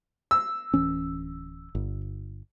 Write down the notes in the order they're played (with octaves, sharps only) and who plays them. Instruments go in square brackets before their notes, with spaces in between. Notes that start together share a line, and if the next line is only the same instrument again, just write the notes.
[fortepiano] E6
[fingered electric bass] D1 E3 C#4
G1